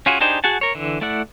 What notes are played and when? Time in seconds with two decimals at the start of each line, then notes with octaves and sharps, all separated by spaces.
0.06 C#4 F4 F#4 G#4
0.21 D4 D#4 G4 G#4 C5
0.44 F#4 G#4 F#5 A5
0.61 A#4 C#5
0.75 D3 E3
1.01 A3 E4 D5 F#5